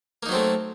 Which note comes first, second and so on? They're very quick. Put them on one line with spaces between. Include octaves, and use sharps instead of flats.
A#3 D#4 F#3 C4 A3